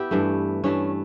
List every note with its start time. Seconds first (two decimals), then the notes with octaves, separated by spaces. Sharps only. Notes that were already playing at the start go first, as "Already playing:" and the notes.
Already playing: B3 E4 G4 B4
0.11 G2 E3 A3
0.64 G2 E3 A3 C#4